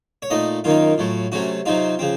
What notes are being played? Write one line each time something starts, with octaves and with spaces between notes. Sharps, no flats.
C#5
A#2 A3 D#4 D#5
F#2 D#3 A#3 D#4 F4
A2 F#3 A3
C3 F#3 A3 C#4 F#4
C3 F#3 C4 D#4 F4
C#3 F3 C4